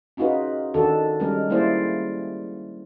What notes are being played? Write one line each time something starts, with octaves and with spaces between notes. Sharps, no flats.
C#4 D#4 F4 F#4 G#4 B4
D#3 D4 F#4 A4
G3 G#3 C#4 A#4
G3 A#3 E4 G#4 C5 D5